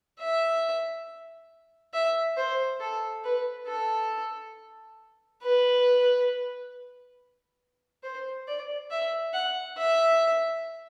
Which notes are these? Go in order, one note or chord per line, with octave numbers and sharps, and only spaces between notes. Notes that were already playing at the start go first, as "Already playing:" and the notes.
E5
E5
C5
A4
B4
A4
B4
C5
D5
E5
F#5
E5